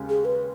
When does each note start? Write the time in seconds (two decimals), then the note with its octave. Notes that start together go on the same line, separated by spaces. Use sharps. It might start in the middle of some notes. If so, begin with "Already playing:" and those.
Already playing: D#2 C#3 G#3
0.09 G#4
0.25 B4